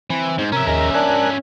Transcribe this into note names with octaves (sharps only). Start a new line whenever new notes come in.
E3 C4
G#2
C3 C#4 A#4 E5
D#2 G#3 A#4 A#5
D4 A#4 G#5 F#6